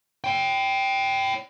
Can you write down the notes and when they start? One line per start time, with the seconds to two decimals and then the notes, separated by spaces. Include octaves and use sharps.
0.24 C#5 G5